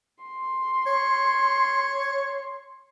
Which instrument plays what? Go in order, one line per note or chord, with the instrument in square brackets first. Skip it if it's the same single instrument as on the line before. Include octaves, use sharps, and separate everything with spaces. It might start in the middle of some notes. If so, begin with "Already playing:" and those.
[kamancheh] C6
[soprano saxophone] C#5